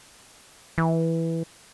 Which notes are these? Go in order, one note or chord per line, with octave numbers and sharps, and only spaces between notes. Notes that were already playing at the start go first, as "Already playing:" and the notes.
E3